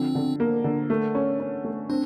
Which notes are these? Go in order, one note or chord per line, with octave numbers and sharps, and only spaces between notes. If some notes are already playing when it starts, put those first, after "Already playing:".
Already playing: D3 F3 C4
D3
A#3
D3
A3
C#4
C#4
A3
C4 D4